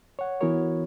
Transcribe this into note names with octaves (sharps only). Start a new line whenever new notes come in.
C#5 F#5
E3 B3 E4 F#4 A#4 C#5